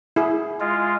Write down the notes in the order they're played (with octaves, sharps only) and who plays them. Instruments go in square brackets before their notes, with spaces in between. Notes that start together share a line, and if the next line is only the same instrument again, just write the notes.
[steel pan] E4 G#4
[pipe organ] G#3 F4